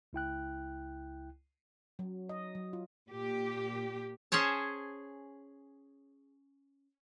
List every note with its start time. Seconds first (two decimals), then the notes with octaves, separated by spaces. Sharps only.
0.13 C#2 E4 G5 F#6
1.99 F#3
2.29 D#5
2.55 F#3
2.73 F4
3.09 A#2 G4
4.32 C#4 G#4 C5 C#5 A5